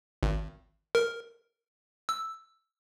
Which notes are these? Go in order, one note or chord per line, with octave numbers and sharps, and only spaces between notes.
G#1
A#4
E6